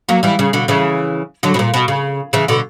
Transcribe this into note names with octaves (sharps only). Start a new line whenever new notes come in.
F#3 A#3
E3 G3
C#3
B2 D3
C#3 E3
D3 F#3
B2
A#2
B2
C#3
C#3 E3
B2 D3